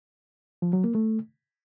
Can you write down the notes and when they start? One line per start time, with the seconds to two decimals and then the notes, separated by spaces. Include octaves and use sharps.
0.62 F3
0.73 F#3
0.84 A#3
0.95 A3